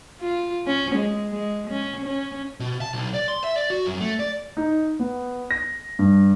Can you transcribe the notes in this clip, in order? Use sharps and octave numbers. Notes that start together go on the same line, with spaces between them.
F4
C#4
G#3
G#3
C#4
C#4
B2
A5
B1
D5
C6
E5
D5
F#4
F#2
A3
D5
D#4
B3
A#6
G2